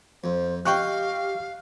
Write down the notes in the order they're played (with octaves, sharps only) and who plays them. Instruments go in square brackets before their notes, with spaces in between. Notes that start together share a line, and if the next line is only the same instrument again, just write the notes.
[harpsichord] F2 [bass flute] C5
[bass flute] G4 [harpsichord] D#5 [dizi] F5 [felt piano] G5 C#6 F#6